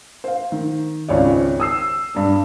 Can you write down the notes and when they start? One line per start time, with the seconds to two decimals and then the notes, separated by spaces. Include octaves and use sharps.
0.24 C5 F5
0.52 D#3
1.08 G#1 C#2 C#5 D5
1.60 D#6 E6 C7
2.15 G2 D4